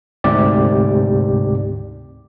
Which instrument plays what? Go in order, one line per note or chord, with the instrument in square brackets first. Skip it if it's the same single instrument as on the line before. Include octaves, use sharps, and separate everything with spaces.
[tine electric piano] D2 G#2 C3 G4 D5